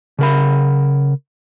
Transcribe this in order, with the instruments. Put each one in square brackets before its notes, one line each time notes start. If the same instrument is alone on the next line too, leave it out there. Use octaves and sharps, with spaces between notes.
[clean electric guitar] C#3 A#4 B5